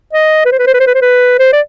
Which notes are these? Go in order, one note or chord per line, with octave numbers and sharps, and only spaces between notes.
D#5
B4
C5
B4
C5
B4
C5
B4
C5
B4
C5
D5